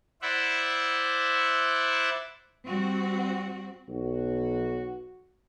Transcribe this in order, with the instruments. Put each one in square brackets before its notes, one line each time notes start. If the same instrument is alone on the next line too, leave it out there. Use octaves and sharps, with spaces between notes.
[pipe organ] E4 C5 D5 E5 F#5
[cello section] G3 C4 F#4
[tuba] B1 [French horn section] F#4